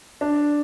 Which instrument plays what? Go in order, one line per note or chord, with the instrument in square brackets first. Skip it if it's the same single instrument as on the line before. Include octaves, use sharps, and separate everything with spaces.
[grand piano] D4